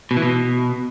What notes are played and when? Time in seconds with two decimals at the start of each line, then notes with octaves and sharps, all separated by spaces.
0.11 B2
0.16 E3
0.22 B2